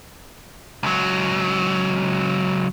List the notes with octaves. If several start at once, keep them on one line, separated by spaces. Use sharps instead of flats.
C#2 F#3